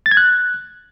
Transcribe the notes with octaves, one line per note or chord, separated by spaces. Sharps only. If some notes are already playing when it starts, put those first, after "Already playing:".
A6
G#6
F#6